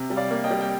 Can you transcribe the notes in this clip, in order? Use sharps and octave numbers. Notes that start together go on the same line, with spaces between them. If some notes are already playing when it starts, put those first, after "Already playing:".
Already playing: C3
G3
D5 F5
A#3
D#5 G5
G3
G5